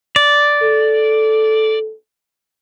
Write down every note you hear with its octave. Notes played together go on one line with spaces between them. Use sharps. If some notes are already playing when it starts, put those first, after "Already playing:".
D5
A4